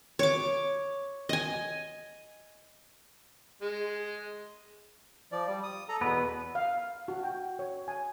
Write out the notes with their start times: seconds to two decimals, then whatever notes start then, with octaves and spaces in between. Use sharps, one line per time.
0.19 C#5 D6
1.29 D#5 G#5
3.62 G#3
5.32 F3 D5
5.47 G3
5.63 D#6
5.89 A4 A#5
6.01 E2 B2 B3 B4
6.55 F5
7.08 F#4
7.23 G5
7.59 C#5
7.88 G#5